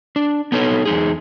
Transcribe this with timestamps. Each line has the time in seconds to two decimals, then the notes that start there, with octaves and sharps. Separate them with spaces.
0.16 D4
0.52 B3 D#4 A4 C#5
0.86 E2 D#4 G#4